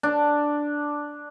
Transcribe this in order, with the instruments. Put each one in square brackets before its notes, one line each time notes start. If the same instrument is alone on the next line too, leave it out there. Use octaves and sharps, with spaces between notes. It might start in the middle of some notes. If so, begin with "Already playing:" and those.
[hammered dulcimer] D4